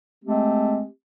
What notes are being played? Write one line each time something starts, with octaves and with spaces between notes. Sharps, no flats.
G#3 A3 C4 G4